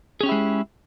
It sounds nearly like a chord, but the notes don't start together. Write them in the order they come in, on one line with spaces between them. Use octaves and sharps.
G#4 C#4 G4 E4 G#3